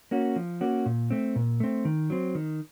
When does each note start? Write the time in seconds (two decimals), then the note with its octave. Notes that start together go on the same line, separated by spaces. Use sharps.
0.11 A#3 C#4 F#4
0.36 F3
0.61 A#3 C#4 F#4
0.86 A#2
1.10 A3 C4
1.36 A#2
1.60 A3 C4
1.85 D#3
2.10 F#3 C4
2.35 D#3